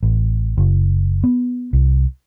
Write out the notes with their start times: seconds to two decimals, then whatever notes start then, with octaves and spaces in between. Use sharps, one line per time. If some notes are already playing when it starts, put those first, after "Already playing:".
0.03 A1
0.57 F#1
1.24 B3
1.73 C2